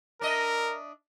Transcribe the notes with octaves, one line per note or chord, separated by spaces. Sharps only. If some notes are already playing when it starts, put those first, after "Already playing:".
D4 A#4 D#5 E5